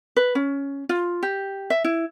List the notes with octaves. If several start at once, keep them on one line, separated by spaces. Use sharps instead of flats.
B4
C#4
F4
G4
E5
E4